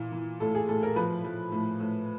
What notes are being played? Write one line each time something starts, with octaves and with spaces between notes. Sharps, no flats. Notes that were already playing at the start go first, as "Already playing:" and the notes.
Already playing: A#2 E3
E3
A2 A4
G#4
A2 A4
A#4
F3 B4
F3
A2
A2